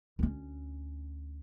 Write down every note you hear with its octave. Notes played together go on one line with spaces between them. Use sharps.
D2 C#4